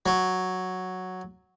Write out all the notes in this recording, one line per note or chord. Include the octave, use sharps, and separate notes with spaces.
F#3